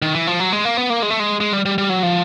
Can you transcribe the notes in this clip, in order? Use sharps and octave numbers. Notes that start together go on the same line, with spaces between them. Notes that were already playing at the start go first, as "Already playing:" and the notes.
D#3
E3
F3
F#3
G#3
A#3
B3
A#3
G#3
A3
G#3
G#3
G3
G3
G3
F#3
F3